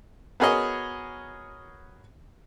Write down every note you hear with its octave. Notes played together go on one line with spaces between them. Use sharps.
B3 F#4 G#4 A#4 C#5 D#5